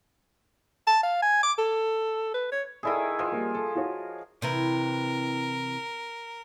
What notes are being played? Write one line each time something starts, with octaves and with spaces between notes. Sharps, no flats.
A5
F5
G#5
D6
A4
B4
C#5
D#3 E4 G#4 A4 D5 A#5
F3 D#6
G3 A#3
A4
F4 F#4 C#5
C3 E3 E4 A#4